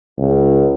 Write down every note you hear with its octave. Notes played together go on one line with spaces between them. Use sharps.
C#2